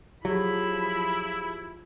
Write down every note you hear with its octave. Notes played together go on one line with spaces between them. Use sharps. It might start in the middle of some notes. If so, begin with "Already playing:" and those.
F3 F#3 E4 G4 G#4 B5